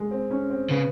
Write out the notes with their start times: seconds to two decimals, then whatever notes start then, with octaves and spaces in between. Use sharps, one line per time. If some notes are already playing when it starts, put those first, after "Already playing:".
Already playing: G#3
0.11 C4
0.31 C#4
0.50 C4
0.70 C#3 B3